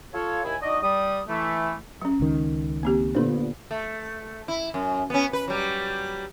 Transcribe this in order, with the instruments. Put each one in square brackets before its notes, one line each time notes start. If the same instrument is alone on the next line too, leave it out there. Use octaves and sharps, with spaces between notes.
[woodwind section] F4 A4 C#5
D#2 E4 G#5
D4 D#4 F#4 D5 D#5
G3 D#6
E3 A3
[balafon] F#3 C#4
[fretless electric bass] C#2 D#3
[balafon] A#3 C4 G4
[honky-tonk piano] A#2 B3 D4 [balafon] D3 A4 C5
[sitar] A3
E4
F#2
B3 C#4
B4
F#3 G3